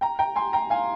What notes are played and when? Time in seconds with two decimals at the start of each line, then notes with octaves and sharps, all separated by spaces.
0.01 G5 A#5
0.19 G5 A#5
0.36 G#5 C6
0.53 G5 A#5
0.70 F5 G#5